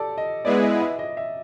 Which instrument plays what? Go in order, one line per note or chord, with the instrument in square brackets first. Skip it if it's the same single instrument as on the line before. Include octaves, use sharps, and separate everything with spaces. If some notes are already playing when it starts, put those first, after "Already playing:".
Already playing: [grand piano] G4 A4 D5
D#5
[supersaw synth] G#3 B3 E4 G#4 B4 [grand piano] D5
[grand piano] D#5
E5
D#5
E5